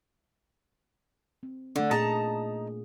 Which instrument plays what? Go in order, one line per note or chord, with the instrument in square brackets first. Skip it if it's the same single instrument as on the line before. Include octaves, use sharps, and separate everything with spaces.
[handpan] C4
[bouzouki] D3 [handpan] A3 D4
[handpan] A#2 A#3 G#4 [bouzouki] D#4 A5 A#5